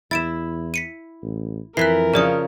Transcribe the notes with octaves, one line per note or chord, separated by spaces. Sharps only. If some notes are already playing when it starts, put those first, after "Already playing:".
E2 E4 E5 A6 D7 E7
B6 C#7 D#7
A1
F2 E3 A#4 F#6 B6 C7
C#3 F3 G#4 C#5 D5 D#6